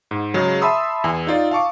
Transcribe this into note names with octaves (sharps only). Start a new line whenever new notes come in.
G#2
C#3 F#3 G#3
E5 A5 B5 C6 D#6 E6
E2 G#5
D#4 F4 D5
F5 A5 C#6 D6